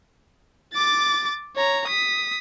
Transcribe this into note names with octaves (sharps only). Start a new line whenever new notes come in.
D6 A6
C#5 A#5
D#6 B6